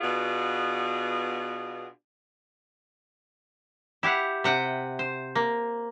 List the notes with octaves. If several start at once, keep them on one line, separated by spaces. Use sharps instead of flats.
B2 B3 D4 F4 G#4
E4 G4 F5 F#5
C3 F#5 G5
C5
A#3